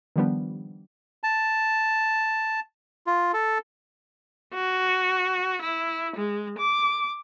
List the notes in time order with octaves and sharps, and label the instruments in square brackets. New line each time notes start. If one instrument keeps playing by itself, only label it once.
[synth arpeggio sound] D#3 F3 G3 B3 D4
[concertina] A5
F4
A4
[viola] F#4
E4
G#3
D6